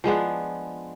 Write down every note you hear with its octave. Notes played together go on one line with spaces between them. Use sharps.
F3 G#3 B3 D4